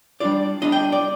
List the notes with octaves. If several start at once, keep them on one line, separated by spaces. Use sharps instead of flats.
G3 D4 F4 D5
G3 D4 F4 D#5
G5
D5